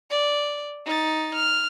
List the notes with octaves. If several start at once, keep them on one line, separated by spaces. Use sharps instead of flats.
D5
D#4 A6
F6